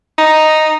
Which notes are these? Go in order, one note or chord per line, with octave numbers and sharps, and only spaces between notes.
D#4